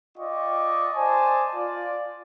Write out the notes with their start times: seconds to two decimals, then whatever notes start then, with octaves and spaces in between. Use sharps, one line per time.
0.18 F4 D5 D#5 G5 C#6
0.95 C5 D5 D#5 G#5 A5
1.53 F4 D5